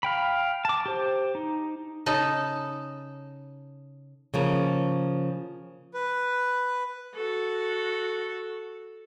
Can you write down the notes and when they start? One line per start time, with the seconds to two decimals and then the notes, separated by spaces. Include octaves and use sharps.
0.03 F5 G5 B5
0.65 A5 D6
0.86 G4 C5
1.35 D#4
2.06 C#3 D#4 A4
4.34 C#3 F3 A#3
5.94 B4
7.15 F#4 A4